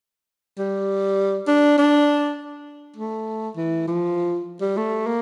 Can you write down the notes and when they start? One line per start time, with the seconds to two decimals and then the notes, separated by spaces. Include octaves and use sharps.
0.58 G3
1.48 D4
1.78 D4
2.97 A3
3.56 E3
3.87 F3
4.61 G3
4.77 A3
5.07 A#3